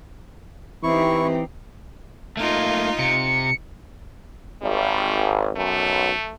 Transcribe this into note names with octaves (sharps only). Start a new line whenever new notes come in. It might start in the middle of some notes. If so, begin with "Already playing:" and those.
E3 C4 D#4 E4 G4 C#6
A3 A#3 D#4 F4
C3 C#7
G#1 G3
B1 F#2 A3